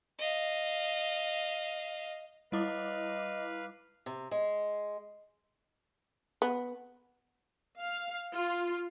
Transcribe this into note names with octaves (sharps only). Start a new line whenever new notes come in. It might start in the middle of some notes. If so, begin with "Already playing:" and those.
D#5 F5
G3 E4 B4 D#5 F5 D6
C3
G#3
B3
F5
F4